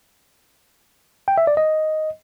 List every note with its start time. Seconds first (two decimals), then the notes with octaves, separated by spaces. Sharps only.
1.28 G5
1.38 E5
1.47 D5
1.57 D#5